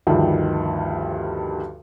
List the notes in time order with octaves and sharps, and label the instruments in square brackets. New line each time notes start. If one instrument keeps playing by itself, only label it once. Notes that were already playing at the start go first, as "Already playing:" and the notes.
[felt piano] D2 G2 D#3 F3 G3